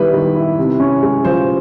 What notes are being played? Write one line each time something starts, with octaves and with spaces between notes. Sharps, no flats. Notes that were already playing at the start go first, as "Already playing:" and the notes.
Already playing: D#3 G3 B3 E4 B4
D#3
E4
C3
C#4
G#3
F3 C5